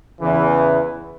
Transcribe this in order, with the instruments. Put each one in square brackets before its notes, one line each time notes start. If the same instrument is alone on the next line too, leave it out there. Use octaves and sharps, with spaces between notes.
[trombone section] E2 C#3 E3